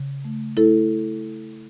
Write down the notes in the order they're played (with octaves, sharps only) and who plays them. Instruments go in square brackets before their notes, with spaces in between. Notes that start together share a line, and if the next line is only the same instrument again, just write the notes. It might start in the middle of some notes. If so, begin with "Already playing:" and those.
Already playing: [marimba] C#3
A3
A3 E4 A4